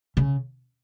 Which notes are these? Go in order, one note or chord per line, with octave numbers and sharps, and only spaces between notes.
C#3